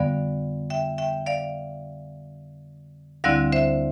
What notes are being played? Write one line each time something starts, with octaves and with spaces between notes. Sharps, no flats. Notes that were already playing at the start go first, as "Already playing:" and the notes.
Already playing: F2 D3 G3 B3 D5 F5
E5 G5
E5 G5
D5 F5
D2 D3 G3 C4 E4 D5 F5
C5 E5